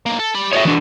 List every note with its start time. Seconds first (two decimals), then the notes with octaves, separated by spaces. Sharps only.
0.06 B1 A#3
0.19 A4
0.35 G4 B5
0.53 F#4 G#4 C#5 D5 E5
0.65 E3 D4